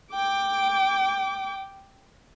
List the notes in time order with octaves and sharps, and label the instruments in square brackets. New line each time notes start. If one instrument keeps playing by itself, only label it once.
[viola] G5 D6